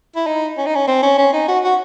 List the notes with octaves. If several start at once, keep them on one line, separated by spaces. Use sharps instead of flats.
E4
D#4
C#4
D#4
C#4
C4
C#4
C#4
D#4
F#4
F#4